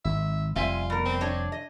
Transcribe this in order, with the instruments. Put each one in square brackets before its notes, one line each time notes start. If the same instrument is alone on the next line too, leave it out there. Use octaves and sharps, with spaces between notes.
[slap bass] G#1 [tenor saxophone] E5
[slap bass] F1 G3 [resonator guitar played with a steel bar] C4 E5 G#5 [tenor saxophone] F4
[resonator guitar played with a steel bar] B2 A#4
[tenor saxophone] C4
[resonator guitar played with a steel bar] D4 C#5 D#5
D#5